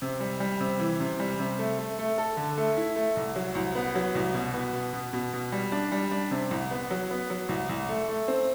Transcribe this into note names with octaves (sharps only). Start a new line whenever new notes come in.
C3
G3
G3
C3
E3
C3
G3
C3
A3
A3
A3
A4
D3
A3
E4
A3
C2
F#3
C2
B3
F#3
C2
B2
B3
B2
B2
B2
B2
G3
D4
G3
D4
C3
C2
B3
F#3
B3
F#3
C2
C2
A3
A3
C4